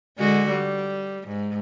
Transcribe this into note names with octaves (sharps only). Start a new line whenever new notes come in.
D3 G#3 F#4
G3
G#2